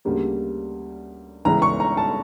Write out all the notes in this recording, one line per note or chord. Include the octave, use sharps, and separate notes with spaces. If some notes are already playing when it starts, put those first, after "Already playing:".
D2 C#3 G3 A#3
C#2 C#3 E3 A#5
C#6
A#5
A5